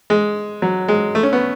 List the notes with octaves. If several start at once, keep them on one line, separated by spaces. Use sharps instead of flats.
G#3
F#3
G#3
A3
C#4
B3